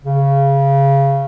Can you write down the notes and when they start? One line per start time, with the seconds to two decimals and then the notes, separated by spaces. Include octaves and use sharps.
0.04 C#3